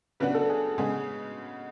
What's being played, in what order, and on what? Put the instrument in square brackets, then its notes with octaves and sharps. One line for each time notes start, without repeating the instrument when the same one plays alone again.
[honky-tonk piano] C#3 F#3 B3 D4 F#4 [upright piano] B4
[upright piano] A4
G#4
[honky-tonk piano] C#3 G#3 B3 [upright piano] G#4